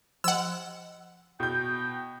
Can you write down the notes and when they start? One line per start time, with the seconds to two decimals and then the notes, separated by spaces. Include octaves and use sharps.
0.24 F3 D#5 F#5 E6
1.40 B2 E4 G5 G6